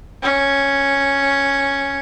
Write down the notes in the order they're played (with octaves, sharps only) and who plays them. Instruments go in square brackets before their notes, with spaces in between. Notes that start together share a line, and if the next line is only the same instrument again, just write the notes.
[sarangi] C#4